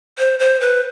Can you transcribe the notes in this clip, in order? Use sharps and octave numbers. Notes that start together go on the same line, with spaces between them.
C5
C5
B4